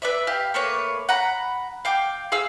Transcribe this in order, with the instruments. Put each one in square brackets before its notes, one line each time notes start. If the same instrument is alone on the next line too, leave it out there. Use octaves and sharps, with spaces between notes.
[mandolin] B4 D5 E5
G4 F5
A3 A#3 B4 C#5
F#5 A#5 B5
F5 G5 D6
G#4 F5 E6